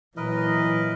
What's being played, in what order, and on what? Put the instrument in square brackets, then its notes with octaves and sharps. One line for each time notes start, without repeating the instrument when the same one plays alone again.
[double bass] A#2 F#3 [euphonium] E3 [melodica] A#4 B4 D#5